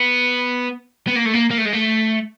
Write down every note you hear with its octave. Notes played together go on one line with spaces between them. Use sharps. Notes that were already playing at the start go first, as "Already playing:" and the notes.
Already playing: B3
B3
A#3
A3
A#3
A#3
A3
G#3
A3